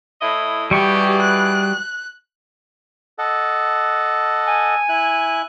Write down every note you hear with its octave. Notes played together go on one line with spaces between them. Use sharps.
A2 E4 D#5
B2 E3 G3 G4 G#4 C#6
F#6
A4 D#5 F#5
G#5
E4 F#6